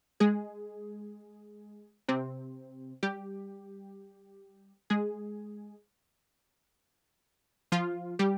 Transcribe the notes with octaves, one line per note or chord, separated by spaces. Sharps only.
G#3 G#4
C3 C4
G3 G4
G#3 G#4
F3 F4
G3 G4